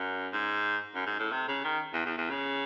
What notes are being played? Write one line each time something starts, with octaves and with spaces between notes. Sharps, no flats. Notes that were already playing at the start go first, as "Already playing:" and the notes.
Already playing: F#2
G#2
F#2
G#2
A2
C3
C#3
D#3
E2
E2
E2
C#3